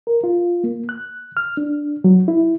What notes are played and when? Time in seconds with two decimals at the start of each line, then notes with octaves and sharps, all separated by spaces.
0.07 A#4
0.24 F4
0.64 A#3
0.89 F#6
1.37 F6
1.57 D4
2.04 F#3
2.28 E4